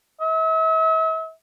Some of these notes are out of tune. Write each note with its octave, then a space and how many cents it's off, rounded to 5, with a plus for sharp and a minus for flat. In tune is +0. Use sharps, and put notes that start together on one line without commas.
E5 -40